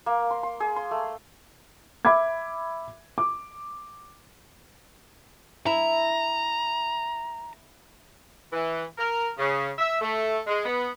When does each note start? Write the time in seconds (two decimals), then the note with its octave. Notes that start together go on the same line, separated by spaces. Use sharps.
0.06 A#3
0.31 C6
0.43 C6
0.60 G#4
0.76 C6
0.91 A3
2.05 E5 B5 D6 G#6
3.18 D6
5.66 E4 A#5
8.53 E3
8.98 A#4
9.38 C#3
9.79 E5
10.01 A3
10.47 G#3
10.65 B3